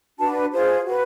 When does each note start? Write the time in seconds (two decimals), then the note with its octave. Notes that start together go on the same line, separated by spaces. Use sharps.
0.18 D4 F#4 B4 A5
0.52 F4 G#4 C5
0.85 F#4 B4